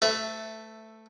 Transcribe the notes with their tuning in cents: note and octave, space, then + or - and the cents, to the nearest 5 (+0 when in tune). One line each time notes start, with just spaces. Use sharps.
A3 +5 B4 +45 E5 +0